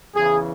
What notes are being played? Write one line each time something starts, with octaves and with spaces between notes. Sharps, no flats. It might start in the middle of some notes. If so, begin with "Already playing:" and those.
E2 C#3 E3 G#4